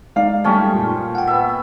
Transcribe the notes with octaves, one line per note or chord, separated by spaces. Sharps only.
G#3 D#4 D5 F5
F3 G3 A3 C#4 G5
A#2
F#5 G5
B3 E5